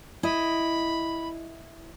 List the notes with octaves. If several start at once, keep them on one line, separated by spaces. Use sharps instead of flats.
E4 D#5 B5